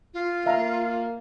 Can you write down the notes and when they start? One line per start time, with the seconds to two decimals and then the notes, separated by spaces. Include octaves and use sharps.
0.14 F4
0.46 A#3 E5 F5 A#5